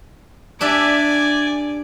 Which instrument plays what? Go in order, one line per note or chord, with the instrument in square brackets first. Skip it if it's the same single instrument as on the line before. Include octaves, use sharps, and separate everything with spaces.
[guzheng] D4 G4 E5 [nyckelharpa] D5 G#5